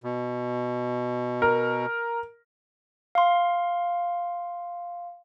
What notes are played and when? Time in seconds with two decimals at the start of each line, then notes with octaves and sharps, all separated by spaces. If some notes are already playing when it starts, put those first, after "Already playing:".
0.04 B2
1.42 A#4
3.15 F5 C6